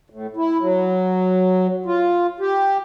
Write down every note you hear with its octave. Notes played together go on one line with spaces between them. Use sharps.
A2
E4
F#3
F4
G4